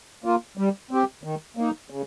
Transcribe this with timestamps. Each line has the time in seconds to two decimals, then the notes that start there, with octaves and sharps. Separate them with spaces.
0.24 A#3 F4
0.57 G3
0.91 C4 G4
1.24 D#3
1.57 A#3 D#4
1.90 C#3